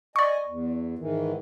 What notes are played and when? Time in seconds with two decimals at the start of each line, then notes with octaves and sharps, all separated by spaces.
0.16 D5 D#5 G#5 C#6
0.47 E2
0.99 G#2 D#3 E3